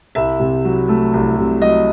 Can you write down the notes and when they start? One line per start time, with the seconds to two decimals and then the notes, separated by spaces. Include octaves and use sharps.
0.15 C2 E5
0.40 C3
0.65 F#3
0.89 A3
1.13 C2
1.37 C3
1.62 F#3 D#5